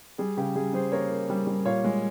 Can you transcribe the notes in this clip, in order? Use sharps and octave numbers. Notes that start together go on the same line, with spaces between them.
G3 G#4
C#3 G4
G3 G#4
G3 G#4 C5
A#3 A#4 C#5
A#3
G3
G3
A#2 C#5 F5
G#3